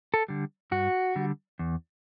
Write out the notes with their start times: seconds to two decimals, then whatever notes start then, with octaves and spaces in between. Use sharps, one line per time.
0.14 A4
0.28 D3 G3
0.71 G2 F#4
1.16 D3 G3
1.59 E2